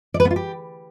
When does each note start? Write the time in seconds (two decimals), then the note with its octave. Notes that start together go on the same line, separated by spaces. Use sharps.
0.14 D5
0.20 B4
0.25 B3
0.31 F4
0.36 G4